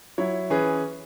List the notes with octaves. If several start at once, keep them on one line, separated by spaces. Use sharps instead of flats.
F#3 E4 C#5
E3 C#4 G#4 B4